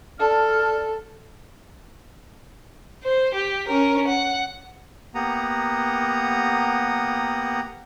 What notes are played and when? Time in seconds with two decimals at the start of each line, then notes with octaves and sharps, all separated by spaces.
0.20 A4 D5 A5 F6
3.04 C5
3.35 G4
3.68 C#4 A#4
4.08 F#5
5.15 A#3 B3 G4 F#5 A#5 D#6